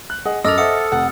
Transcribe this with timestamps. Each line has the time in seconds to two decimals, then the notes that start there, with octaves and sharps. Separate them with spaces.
0.10 F#6
0.25 G#4 D#5 F#5
0.45 F#2 A4 D#5 D6 E6 F6 A6 F7
0.58 A4 C5 E5 F#5 D#6 C#7
0.92 F1 F#5